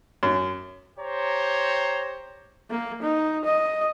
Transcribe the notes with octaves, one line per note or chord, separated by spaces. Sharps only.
F#2
G4 C5 C#5 A#5
A#3
D#4
D#5